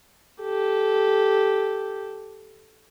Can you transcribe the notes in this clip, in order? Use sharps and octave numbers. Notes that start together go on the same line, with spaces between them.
G4 A4